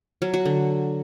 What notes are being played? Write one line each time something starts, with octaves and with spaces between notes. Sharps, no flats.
F#3
F#4
D3